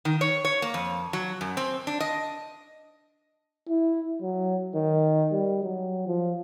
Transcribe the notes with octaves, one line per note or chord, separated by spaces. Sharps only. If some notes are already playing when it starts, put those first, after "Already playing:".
D#3
C#5
C#5
A#3
F2
F#3
F#2
C4
D4
D#5
E4
F#3
D#3
G3
F#3
F3